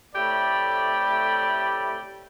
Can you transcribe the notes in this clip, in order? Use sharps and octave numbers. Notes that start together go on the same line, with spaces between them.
A2 C3 A3 G4 D5 B5